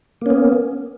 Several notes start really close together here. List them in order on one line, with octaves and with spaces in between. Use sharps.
A#3 C#4 B3